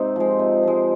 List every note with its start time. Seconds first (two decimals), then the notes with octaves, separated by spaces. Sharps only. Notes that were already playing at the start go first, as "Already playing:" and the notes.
Already playing: G#2 C3 C4 D#4
0.16 F3 G#3
0.39 C3
0.63 F3 G#3